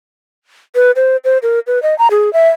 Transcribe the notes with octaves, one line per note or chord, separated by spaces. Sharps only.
B4
C5
C5
A#4
B4
D#5
A#5
G#4
E5